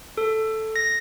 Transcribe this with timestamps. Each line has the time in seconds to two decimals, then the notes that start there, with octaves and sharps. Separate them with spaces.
0.18 A4
0.76 A#6